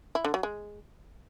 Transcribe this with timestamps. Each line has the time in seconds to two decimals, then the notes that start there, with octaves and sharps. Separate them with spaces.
0.15 E4
0.25 D3
0.34 F#3
0.43 G#3